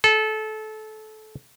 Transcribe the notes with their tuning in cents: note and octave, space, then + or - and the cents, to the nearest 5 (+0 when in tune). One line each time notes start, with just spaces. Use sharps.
A4 -25